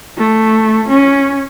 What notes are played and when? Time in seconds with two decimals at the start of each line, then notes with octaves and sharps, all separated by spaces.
0.18 A3
0.89 C#4